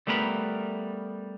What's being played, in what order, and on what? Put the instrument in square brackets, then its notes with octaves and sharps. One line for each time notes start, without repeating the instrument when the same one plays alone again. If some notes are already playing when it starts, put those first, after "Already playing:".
[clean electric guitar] G3 A3 B3 A#4 C5 B5